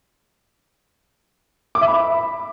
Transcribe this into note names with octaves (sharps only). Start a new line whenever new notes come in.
D6
E5
B5